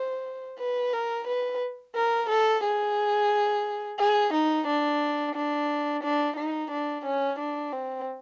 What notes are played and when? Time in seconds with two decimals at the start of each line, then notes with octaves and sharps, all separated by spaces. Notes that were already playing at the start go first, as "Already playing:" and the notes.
Already playing: C5
0.59 B4
0.93 A#4
1.27 B4
1.95 A#4
2.30 A4
2.64 G#4
3.99 G#4
4.33 D#4
4.68 D4
5.35 D4
6.03 D4
6.37 D#4
6.71 D4
7.05 C#4
7.39 D4
7.73 C4